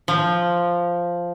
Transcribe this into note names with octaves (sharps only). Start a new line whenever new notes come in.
F3